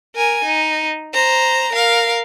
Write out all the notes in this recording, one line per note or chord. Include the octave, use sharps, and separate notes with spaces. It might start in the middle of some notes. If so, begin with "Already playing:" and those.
A#4 G#5
D#4
C5 A#5
A#4 F5